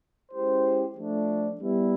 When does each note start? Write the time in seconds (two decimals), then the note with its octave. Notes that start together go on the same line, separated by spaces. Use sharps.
0.32 G#3 C#4 E4 G4 C5
0.96 F3 A3 D4
1.60 G3 B3 E4